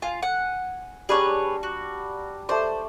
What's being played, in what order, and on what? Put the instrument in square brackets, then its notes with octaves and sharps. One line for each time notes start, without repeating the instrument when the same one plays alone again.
[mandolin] F4 [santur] G#5
[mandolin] F#5
[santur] G3 D4 A#5 [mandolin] G#4 B4 C#5
[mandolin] F#4
[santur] A3 D5 [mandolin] C5